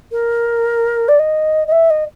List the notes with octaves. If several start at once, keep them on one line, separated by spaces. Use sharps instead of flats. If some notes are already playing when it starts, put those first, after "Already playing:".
A#4
D5
D#5
D#5
E5
D#5